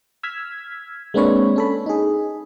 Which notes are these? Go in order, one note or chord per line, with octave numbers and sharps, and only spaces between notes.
E6 F6 G#6 B6
G#3 A#3 C4 D4 B4 C#5
C#4 A4 B5
D#4 G#4